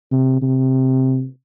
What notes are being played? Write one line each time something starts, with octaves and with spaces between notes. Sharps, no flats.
C3
C3